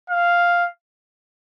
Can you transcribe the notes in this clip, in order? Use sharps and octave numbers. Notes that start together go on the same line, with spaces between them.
F5